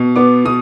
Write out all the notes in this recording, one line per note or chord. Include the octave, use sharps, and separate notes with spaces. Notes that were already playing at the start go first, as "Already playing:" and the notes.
Already playing: B2
B3 D6
B2 D#6